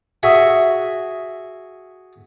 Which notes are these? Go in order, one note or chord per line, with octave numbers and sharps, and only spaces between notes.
F#4 G#4 E5